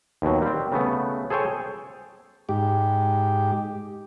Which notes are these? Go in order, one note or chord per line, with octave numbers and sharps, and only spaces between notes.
D#2 B2 F#3
G3 C4
C#3 A3 B3
G#4 A4 C5 C#5 G5 G#5
G#2 G4